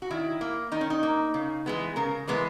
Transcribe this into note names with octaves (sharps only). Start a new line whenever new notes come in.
F#4
D#3 E4
A#3
D#3 D#4
C#4
D#4
A#3
C#3
E3 G#3 B3
C#3 A#4
E3 G#3 B3 B4